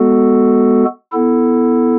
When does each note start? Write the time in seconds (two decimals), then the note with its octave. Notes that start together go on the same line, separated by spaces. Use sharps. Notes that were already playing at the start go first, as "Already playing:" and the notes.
Already playing: G#3 B3 F#4 A4
1.12 B3 E4 A4